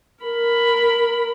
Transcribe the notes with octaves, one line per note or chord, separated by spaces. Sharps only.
A#4 B5